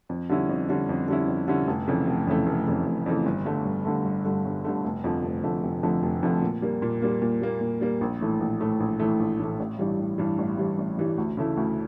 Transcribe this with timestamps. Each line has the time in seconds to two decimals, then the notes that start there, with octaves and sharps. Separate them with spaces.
0.09 F2
0.29 D3 G3 C#4 E4
0.49 F2
0.69 D3 G3 C#4 E4
0.89 F2
1.08 D3 G3 C#4 E4
1.28 F2
1.48 D3 G3 C#4 E4
1.67 F1
1.87 F2 C#3 E3 A3
2.07 F1
2.27 F2 C#3 E3 A3
2.46 F1
2.67 F2 C#3 E3 A3
2.86 F1
3.06 F2 C#3 E3 A3
3.26 G1
3.46 G2 D3 A3
3.66 G1
3.85 G2 D3 A3
4.05 G1
4.25 G2 D3 A3
4.45 G1
4.64 G2 D3 A3
4.84 F1
5.04 F2 D3 F3 A3
5.24 F1
5.43 F2 D3 F3 A3
5.63 F1
5.83 F2 D3 F3 A3
6.03 F1
6.23 F2 D3 F3 A3
6.42 A#2
6.62 G3 A#3
6.82 A#2
7.02 G3 A#3
7.22 A#2
7.41 G3 A#3
7.61 A#2
7.81 G3 A#3
8.01 A#1
8.21 A2 E3 A3
8.40 A#1
8.60 A2 E3 A3
8.80 A#1
9.00 A2 E3 A3
9.20 A#1
9.39 A2 E3 A3
9.60 A1
9.79 G2 E3 G3
9.99 A1
10.18 G2 E3 G3
10.38 A1
10.58 G2 E3 G3
10.78 A1
10.98 G2 E3 G3
11.18 D2
11.37 C#3 E3 A3 E4
11.57 D2